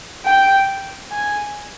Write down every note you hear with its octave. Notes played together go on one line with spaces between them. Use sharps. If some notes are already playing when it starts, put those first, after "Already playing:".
G5
G#5